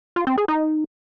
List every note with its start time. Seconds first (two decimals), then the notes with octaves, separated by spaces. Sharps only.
0.16 F4
0.27 C4
0.38 G#4
0.48 D#4